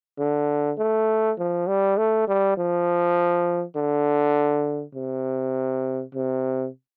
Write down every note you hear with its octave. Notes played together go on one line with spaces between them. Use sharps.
D3
A3
F3
G3
A3
G3
F3
D3
C3
C3